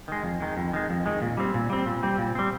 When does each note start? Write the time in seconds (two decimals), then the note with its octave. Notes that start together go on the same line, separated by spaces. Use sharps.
0.08 D#3 G#3
0.24 F2
0.41 D#3 G#3
0.57 F2
0.73 D#3 G#3
0.90 F2
1.06 D#3 G#3
1.22 A#2
1.37 G3 C4
1.54 A#2
1.70 G3 C4
1.86 A#2
2.03 G3 C4
2.18 A#2
2.35 G3 C4